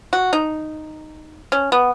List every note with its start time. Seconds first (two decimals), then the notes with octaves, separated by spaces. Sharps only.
0.13 F#4
0.33 D#4
1.52 C#4
1.72 B3